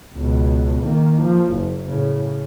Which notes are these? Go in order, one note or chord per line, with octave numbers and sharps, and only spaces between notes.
C#2 B2
D#3 A#3
F3
F#1
A2 C#3